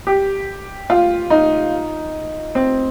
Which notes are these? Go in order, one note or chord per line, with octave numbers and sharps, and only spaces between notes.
G4
F4
D#4
C4